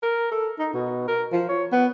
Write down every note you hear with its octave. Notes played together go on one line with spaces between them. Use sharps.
A#4
A4
D#4
B2
A#4
F3
C#5
B3